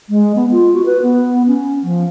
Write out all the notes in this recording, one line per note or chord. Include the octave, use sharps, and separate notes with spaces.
G#3
B3
F4
F#4
B4
B3
C#4
F3